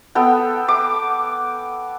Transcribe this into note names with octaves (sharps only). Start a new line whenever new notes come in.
B3 A4 G5
D6